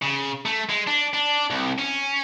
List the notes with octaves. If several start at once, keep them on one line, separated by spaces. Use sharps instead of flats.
C#3
A3
G#3
D4
D4
C2
C#4